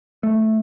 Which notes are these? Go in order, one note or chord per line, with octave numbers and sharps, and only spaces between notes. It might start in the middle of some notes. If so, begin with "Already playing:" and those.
A3